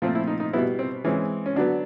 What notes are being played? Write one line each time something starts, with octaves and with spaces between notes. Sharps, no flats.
A#2 F3 A3 C4 F4
E4
D#4
D#4
B2 G3 B3 E4
C4
E3 G#3 C4 C#4
C#4
D3 F#3 B3 D4